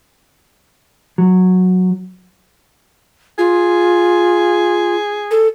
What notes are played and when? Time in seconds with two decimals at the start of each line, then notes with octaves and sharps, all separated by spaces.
1.18 F#3
3.38 F4 G#4
5.31 A4